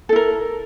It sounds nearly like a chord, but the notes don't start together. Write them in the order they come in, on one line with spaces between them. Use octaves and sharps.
A4 E4 A#4